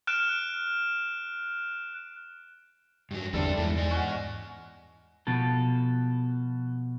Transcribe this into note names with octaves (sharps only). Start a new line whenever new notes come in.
F6 F#6 D7 E7
G2 F#3
E2 G2 D3 G3 C4 A4 D5 E5
E2 G#3 A3 E4
G#2 D#5 G#5
C#4 F#4
B2 F3 A4